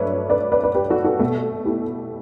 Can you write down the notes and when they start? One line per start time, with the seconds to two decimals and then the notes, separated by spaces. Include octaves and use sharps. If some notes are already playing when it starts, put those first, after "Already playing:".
Already playing: G2 F#3 A3 A4 B4 C#5 D5 E5
0.30 B4 D5
0.52 B4 D5
0.63 B4 D5
0.75 G4 B4
0.90 F#4 A4
1.04 F#4 A4
1.20 B2 A3
1.65 E4 G4